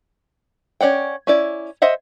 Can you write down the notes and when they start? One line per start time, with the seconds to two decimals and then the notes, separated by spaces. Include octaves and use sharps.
0.81 C#4 D5 F#5 G5
1.27 C#4 E4 D5
1.82 C5 D#5 E5 F#5